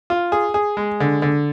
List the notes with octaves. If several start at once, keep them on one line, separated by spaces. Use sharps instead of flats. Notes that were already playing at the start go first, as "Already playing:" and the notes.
F4
G#4
G#4
G#3
D3
D3